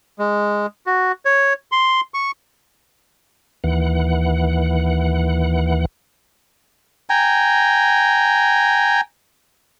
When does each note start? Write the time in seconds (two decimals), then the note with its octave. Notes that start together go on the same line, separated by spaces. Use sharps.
0.19 G#3
0.86 F#4
1.25 C#5
1.72 C6
2.14 C#6
3.64 D#2 E3 F#5
7.10 G5 G#5 A#5